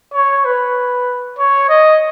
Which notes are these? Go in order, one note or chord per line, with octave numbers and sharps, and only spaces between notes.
C#5
B4
C#5
D#5